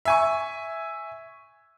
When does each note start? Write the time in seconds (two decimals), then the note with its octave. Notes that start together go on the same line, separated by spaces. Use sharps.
0.05 E5 G#5 C#6